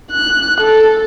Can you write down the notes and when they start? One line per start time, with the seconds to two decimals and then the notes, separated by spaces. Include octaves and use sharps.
0.12 F#6
0.60 A4